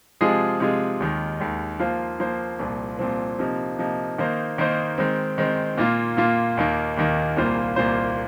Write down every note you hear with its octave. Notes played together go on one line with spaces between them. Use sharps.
C3 F3 G#3 F4 G#4
C3 F3 G#3 F4 G#4
D#2 D#3 G#3
D#2 D#3 G#3
F3 A#3 F4 C5
F3 A#3 F4 C5
C2 A#2 F3 C4
C2 A#2 F3 C4
C3 F3 A#3 D#4
C3 F3 A#3 D#4
D#3 A#3 D#4 C5
D#3 A#3 D#4 C5
D#3 G#3 C4
D#3 G#3 C4
A#2 A#3 F4
A#2 A#3 F4
D#2 D#3 A#3
D#2 D#3 A#3
C2 A#2 A#3 F4 C5
C2 A#2 A#3 F4 C5